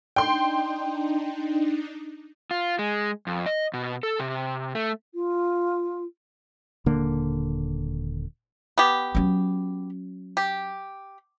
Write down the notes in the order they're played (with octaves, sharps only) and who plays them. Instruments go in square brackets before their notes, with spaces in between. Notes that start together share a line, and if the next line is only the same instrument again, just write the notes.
[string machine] D4 D#4 [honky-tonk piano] G5 C6
[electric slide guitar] F4
G#3
F2
D#5
B2
A4
C3
A3
[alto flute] F4
[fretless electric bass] D#1 D3 A#3
[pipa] B3 G4
[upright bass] F#3 C#4
[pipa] G4